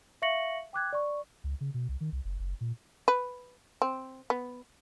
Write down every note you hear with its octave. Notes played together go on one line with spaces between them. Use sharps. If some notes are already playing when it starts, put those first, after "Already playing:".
E5 F5 C#6 A#6 C#7 F#7
G5 D6 F#6 G#6
D5 C#6
C#2
C#3
B2
C2
D#3
C2
F#1
F#1
A#2
B4
C4
B3